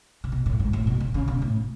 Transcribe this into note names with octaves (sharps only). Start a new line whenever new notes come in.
C#3
B2
A2
G#2
A2
B2
C#3
C#3
B2
A2